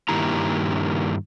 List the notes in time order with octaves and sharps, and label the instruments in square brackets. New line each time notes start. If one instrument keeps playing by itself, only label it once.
[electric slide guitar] G2 D#3 A#3 E4 G4 A#5